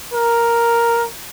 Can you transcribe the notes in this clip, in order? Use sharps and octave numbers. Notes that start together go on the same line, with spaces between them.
A#4